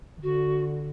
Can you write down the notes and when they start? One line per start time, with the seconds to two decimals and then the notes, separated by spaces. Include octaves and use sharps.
0.17 E3
0.22 D3 F#4